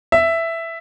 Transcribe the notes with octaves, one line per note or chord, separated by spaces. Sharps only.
E5